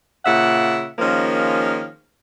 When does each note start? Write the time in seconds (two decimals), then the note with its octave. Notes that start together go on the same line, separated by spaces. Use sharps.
0.25 A#2 C#3 E5 F#5
0.99 D#3 F3 G#3 A#3 C#4